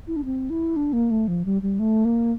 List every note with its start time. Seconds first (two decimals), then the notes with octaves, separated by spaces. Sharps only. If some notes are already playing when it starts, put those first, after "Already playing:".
0.07 E4
0.16 D4
0.25 C4
0.50 E4
0.76 D4
0.93 A#3
1.11 A3
1.28 F3
1.45 G3
1.62 G3
1.79 A3
2.05 A#3